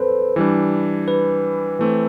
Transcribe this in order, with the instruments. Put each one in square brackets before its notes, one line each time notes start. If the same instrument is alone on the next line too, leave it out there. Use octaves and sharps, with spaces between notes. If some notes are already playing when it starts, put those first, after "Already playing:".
Already playing: [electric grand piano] C4 [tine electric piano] A4 B4 C5
[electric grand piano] E3 G3 D4
[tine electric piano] B4
[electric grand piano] E3 A3 C4